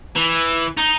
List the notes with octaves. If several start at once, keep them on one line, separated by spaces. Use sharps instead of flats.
E3
D#4